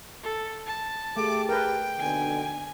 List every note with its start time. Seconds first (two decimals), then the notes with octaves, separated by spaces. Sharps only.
0.23 A4
0.66 A5
1.17 A3 G4 G#4 D6
1.49 A#4 B4 G5
1.99 D#2 B2 D3 G#5